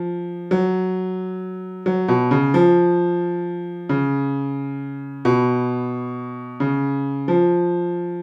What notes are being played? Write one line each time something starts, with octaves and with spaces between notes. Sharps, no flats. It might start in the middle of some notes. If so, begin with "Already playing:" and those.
Already playing: F3
F#3
F#3
B2
C#3
F3
C#3
B2
C#3
F3